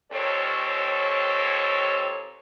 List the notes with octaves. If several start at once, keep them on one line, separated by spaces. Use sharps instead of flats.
D#2 A#2 C4 A4 C#5